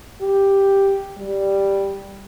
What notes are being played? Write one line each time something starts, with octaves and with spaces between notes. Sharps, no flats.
G4
G3